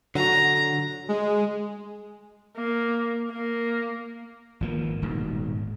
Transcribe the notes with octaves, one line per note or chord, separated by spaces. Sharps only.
D3 F#3 F#4 A#5
G#3
A#3
A#3
G#1 F3 A#3
D#1 G#2 B2